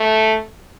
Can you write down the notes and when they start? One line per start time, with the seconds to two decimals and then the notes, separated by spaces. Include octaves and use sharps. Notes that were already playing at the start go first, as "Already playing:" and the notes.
Already playing: A3